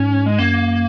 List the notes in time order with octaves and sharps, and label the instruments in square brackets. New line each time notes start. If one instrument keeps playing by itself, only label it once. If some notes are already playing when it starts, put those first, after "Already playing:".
Already playing: [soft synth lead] G#2 [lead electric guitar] C#4
[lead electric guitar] G#3
[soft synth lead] F#2 [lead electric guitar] A#3